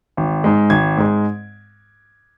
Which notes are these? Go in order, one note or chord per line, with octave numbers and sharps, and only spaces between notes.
G#1
G#2 G#3
G#1 G#6
G#2 G#3